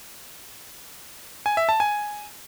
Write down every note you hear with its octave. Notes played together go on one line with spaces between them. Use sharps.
G#5
E5
A5
G#5